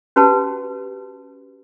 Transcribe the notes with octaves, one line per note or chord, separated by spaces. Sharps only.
C#4 F#4 G4 B4 F#5 A5